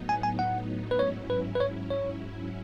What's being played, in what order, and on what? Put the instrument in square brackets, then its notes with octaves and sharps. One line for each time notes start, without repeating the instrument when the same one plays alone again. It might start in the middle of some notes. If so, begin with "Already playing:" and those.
Already playing: [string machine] A2 F#3 B3 D#4
[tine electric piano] G#5
G#5
F#5
B4
[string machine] G#2 F#3 C#4 E4 [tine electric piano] C#5
[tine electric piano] B4
B4
C#5
C#5